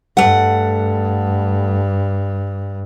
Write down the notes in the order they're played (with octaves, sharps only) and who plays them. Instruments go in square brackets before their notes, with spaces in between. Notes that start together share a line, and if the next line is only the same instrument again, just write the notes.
[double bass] G2 [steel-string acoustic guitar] A3 F#5